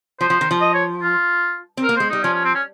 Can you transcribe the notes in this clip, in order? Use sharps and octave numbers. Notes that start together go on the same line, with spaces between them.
F3 C5
F3
D#3
F3
D#5
C#5
F4
C4
A#4
A#3
G#3 C5
G3 D#4
F3 C#4
C#4
C4
C#4